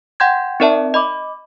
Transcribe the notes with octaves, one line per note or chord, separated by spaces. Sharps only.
F#5 G5 C6 G6 G#6
C4 D#4 A#4 D5 E5 A5
D#5 B5 D6